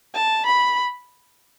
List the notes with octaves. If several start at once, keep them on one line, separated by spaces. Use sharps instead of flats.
A5
B5